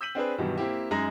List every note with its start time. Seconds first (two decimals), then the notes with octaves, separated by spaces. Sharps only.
0.01 E6 G6 B6 D#7 F#7
0.15 C4 D4 G#4 B4
0.38 G2 B2 D#3 E3 F#3
0.58 A#3 C4 E4 G4
0.91 F#2 G#3 D#4 G#4 A#5 A#6